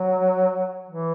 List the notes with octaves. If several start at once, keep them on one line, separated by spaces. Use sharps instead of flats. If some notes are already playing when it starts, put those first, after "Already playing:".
Already playing: F#3
E3